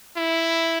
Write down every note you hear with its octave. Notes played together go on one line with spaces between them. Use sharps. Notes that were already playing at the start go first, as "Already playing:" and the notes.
E4